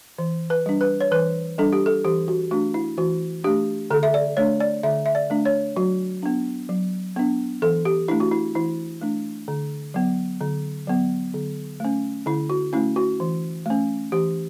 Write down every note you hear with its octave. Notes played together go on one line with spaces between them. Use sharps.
E3
B4
G3 D4
B4
C#5
E3 B4
G3 D4 A4
G4
A4
E3 G4
F#4
A3 D4 F#4
E4
E3 F#4
A3 D4 G4
D3 A4
E5
D5
A3 D4 C#5
D5
D3 E5
E5
D5
A3 D4
C#5
F#3 F#4
B3 D4
F#3
B3 D4
E3 A4
G4
A3 D4 E4
F#4
E4
E3 E4
A3 D4
D3
F#3 B3
D3
F#3 B3
D3
A3 C#4
D3 E4
F#4
A3 C#4 E4
F#4
E3
A3 C#4
E3 G4